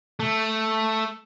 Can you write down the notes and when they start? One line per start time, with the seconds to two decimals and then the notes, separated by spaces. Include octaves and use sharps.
0.20 A3